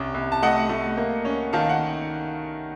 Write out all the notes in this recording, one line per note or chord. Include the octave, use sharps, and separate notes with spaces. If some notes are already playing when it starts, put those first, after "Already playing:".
Already playing: C2 C#4
C2
A5
A3 D#5 F#5
A3
A#3
C#4
D#3 F5 A5
F#5